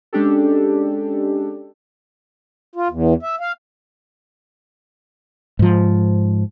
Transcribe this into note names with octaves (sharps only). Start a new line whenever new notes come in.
G#3 C#4 D4 G4 A4
F4
E2
E5
F5
G#2 F3